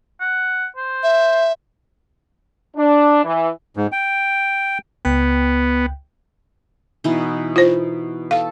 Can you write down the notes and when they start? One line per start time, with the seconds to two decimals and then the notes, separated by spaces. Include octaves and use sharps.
0.21 F#5
0.76 C5
1.03 E5
2.76 D4
3.24 E3
3.77 G#2
3.92 G5
5.05 C#2 B3 G5
7.04 B2 E3 D#4
7.56 F4 C5
8.31 A4 F5